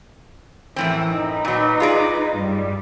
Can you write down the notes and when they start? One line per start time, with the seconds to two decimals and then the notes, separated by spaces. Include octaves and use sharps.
0.76 F#2 A2 E3 C4
1.16 D#4 B4
1.45 A#2 F#3
1.80 F4 G#4 D5
2.36 G2 G3